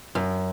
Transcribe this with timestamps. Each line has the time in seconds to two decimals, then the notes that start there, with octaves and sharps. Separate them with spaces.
0.15 F#2